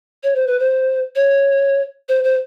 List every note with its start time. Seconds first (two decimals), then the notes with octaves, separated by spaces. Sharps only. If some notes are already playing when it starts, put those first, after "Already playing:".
0.23 C#5
0.35 C5
0.47 B4
0.60 C5
1.16 C#5
2.09 C5
2.24 C5